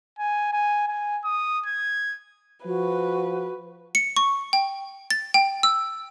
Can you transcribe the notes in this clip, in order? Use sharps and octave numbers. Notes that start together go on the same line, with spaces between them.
G#5
G#5
G#5
D#6
G#6
F3 F#4 B4
C#7
C#6
G5
A6
G5
E6